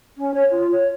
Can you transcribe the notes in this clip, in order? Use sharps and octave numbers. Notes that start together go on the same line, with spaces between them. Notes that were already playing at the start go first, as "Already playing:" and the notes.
C#4
C#5
F4
C#5